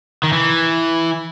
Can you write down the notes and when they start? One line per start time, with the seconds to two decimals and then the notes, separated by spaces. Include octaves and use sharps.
0.23 D#3
0.33 E3